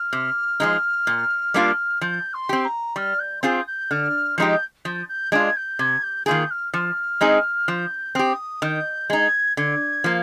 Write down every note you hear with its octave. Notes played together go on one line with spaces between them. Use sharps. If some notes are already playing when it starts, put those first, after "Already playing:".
Already playing: F6
C3
F3 G#3 D#4
A#2
G3 A#3 D4 F4
F3 G6
C6
C4 G4
A#5
G3 F6
G6
C4 F4 G#4 G6
G6
D3 F6
F3 G#3 D#4 G4 G6
F3 G6
G6
G#3 D4 F4 G#6
G6
C3 G#6
G6
D#3 A#3 F4 G#4 G6
F6
F3 F6
G#3 C4 D#4 G#4
F3 G6
C4 G4 D#6
D#3 G6
G#3 D#4 G#6
D3 G#6
F3 A#3